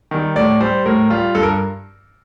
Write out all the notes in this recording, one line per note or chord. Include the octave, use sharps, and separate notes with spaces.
D#3 G3
A2 D5
G3 C5
A2 A#4
G3 F4
G2 A4
A#4